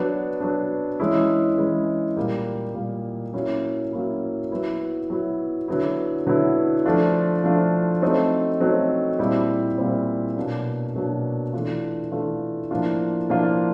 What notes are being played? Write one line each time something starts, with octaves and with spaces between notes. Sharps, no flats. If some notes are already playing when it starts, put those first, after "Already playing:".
Already playing: F#3 B3 D4
F#3 B3 D4
E3 G#3 C#4 E4
E3 G#3 C#4 E4
A#2 G3 A#3
A#2 G3 A#3
F#3 A#3 C#4 E4
F#3 A#3 C#4 E4
F#3 B3 E4
F#3 B3 E4
D3 F#3 B3 E4
D3 F#3 B3 E4
F3 A3 D4 F4
F3 A3 D4 F4
F#3 A3 C4 D#4
F#3 A3 C4 D#4
A#2 G3 C4 E4
A#2 G3 C4 E4
B2 F#3 A#3 D4
B2 F#3 A#3 D4
E3 A3 D4 F4
E3 A3 D4 F4
A2 F3 A#3 D4 F4
A2 F3 A#3 D4 F4